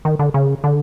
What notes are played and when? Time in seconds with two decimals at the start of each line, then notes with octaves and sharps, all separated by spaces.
0.05 D#3
0.19 D3
0.34 C#3
0.64 D3